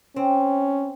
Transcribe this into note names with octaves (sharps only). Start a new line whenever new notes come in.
C4 C#4